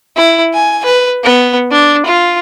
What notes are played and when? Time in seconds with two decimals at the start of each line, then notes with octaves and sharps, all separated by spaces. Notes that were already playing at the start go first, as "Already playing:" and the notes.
0.17 E4
0.54 G#5
0.85 B4
1.24 B3
1.71 D4
2.06 F4